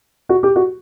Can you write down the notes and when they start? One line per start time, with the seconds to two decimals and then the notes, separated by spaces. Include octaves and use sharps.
0.29 F#4
0.43 G4
0.56 F#4